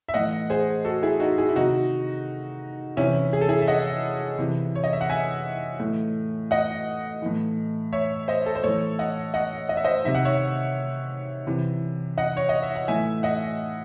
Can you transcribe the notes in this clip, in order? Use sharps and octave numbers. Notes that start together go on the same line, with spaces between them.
E5
A2 E3 D#5 F#5
G#4 C5
F#4 A4
E4 G#4
D#4 F#4
E4 G#4
E4
C3 D#3 D#4 F#4
C3 E3 C#4 E4
G#4
A4
E4 G#4
E5
D#5 F#5
C3 E3
C#5
D#5
E5
F#5
E5 G#5
A2 E3
D#5 F#5
A2 E3
C#5 E5
C5 D#5
A4
C5
A2 E3 A4 C#5
D#5 F#5
D#5 F#5
D#5
E5
C5 D#5
C3 D#3 E5
F#5
C#5 E5
C3 E3
D#5 F#5
C#5
D#5
E5
F#5
A2 E3 E5 G#5
D#5 F#5